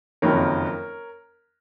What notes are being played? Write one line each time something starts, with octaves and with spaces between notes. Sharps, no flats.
F#1 F2 D#3 F#3 A#4 C#5